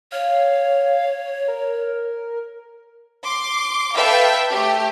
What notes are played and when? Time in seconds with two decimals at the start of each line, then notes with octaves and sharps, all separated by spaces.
0.12 C#5 F5
1.48 A#4
3.24 C6 D6
3.96 A4 B4 E5 F5 G5
4.51 A3 G4